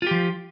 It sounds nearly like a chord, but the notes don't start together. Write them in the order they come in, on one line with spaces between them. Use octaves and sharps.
F4 G4 F3